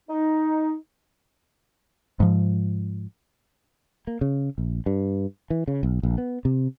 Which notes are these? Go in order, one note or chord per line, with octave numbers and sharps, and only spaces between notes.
D#4
G#2 F3
A#3
C#3
A#1
G2
E3
C#3
B1
A#1
B3
C3